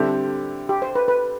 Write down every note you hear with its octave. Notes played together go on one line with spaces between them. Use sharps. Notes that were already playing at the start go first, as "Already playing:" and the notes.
Already playing: D3 G3 C4 E4 G4 A4
G4
C5
B4
B4